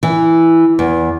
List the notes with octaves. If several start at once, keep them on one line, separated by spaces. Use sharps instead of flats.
E3
E2